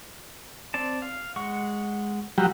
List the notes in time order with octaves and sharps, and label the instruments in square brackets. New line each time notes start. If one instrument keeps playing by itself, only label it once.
[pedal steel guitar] C4 D5 A5
F5
G#3 F#5 C#6
[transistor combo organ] F#3 G3